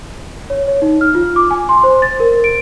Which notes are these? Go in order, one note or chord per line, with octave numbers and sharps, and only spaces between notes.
C#5
C#5
D#4
F6
F4
D6
G#5
C6
C5
A6
A#4
D7